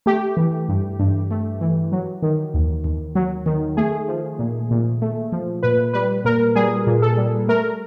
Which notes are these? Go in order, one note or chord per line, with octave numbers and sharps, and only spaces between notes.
A3 G4
E3
G2
G2
A3
E3
F#3
D#3
D#2
D#2
F#3
D#3
A3 G#4
F3
A#2
A#2
A3
F3
A#2 B4
G3 B4
A#2 A#4
G3 G#4
A#2
A4
G3
A3 A#4